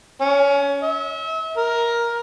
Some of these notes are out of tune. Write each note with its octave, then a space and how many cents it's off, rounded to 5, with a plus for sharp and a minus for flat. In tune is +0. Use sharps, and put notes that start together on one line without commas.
C#4 +25
E5 -35
A#4 +10